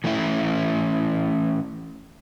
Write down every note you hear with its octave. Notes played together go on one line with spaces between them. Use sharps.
E3 A3 C#4 E4